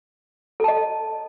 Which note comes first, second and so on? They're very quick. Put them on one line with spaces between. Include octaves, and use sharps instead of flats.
A4 A5 D#5